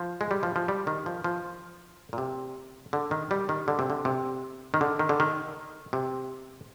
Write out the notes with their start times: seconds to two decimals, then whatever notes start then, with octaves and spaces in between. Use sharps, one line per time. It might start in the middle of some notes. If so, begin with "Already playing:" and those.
Already playing: F3
0.21 G#3
0.31 G3
0.43 F3
0.56 F3
0.68 G3
0.87 D#3
1.06 F3
1.24 F3
2.13 A#2
2.18 C3
2.93 D3
3.11 D#3
3.31 G3
3.49 D#3
3.68 D3
3.79 C3
3.90 D3
4.05 C3
4.74 D#3
4.81 D3
4.99 D#3
5.09 D3
5.20 D#3
5.93 C3